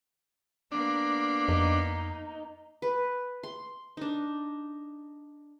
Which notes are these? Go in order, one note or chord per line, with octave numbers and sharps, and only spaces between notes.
A#3 B3 D4
F2 D#4
B4
C6
D4 D#4